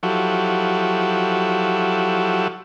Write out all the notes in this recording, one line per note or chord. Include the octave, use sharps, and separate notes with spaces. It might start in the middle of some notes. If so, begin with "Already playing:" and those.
F3 F#3 E4 F#4 G4 A4